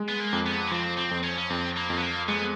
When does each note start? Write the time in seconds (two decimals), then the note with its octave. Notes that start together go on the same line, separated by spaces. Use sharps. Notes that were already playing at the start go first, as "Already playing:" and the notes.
Already playing: G#3
0.09 B3
0.20 A#3
0.33 F2
0.46 B3
0.67 C#4
0.71 F3 C4
0.98 C4
1.11 F2
1.24 C#4
1.38 C#4
1.50 F2 C4
1.77 A#3
1.90 F2
1.98 B3
2.02 A#3
2.28 G#3 B3